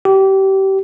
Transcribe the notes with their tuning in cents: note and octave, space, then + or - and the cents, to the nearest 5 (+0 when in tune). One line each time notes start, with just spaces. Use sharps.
G4 -25